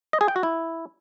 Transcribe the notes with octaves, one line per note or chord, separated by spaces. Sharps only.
D#5
G#4
G5
F#4
E4